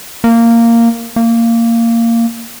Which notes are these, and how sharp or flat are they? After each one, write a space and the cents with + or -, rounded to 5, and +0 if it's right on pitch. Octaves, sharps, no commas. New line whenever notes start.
A#3 -10
A#3 -15